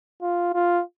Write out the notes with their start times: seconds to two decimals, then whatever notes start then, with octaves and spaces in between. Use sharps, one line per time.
0.22 F4
0.53 F4